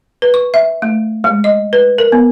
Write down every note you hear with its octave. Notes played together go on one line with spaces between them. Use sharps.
B4
C#6
E5
A3
G#3
D#5
B4
A#4
B3